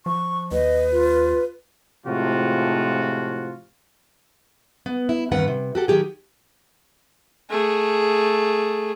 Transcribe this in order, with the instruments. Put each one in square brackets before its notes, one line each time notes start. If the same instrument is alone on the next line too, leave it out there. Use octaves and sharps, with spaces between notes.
[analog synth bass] F3 [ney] C#6
[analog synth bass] D#2 [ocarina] B4 [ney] D#5
[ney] F4
[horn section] A2 C3 F3 G#3 F4 F#4
[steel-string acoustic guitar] B3
E4
E2 G2 D#3 C4 B4 F#5
C3
F#4 G4 A4
D#3 F#3 G4 G#4
[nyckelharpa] A3 G#4